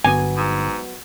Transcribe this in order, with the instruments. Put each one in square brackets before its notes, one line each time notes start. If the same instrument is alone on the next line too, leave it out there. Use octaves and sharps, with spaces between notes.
[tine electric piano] G1 [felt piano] F#3 B3 [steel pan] G#5
[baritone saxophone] G#2